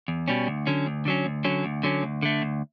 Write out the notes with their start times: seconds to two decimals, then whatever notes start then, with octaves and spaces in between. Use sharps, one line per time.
0.08 E2
0.28 B2 G3 C#4
0.47 D2
0.67 D3 F#3 C#4
0.86 D2
1.05 D3 F#3 C#4
1.26 D2
1.44 D3 F#3 C#4
1.65 D2
1.83 D3 F#3 C#4
2.03 D2
2.22 D3 A3
2.42 D2